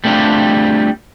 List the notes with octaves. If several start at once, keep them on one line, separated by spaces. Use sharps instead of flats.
G3 A3 C4 D4 F4 G4